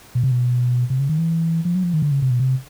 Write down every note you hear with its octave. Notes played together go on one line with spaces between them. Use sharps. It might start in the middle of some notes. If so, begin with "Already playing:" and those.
B2
C3
B2
C3
C#3
D#3
E3
F3
F#3
F3
D#3
D3
C#3
C3
B2
C3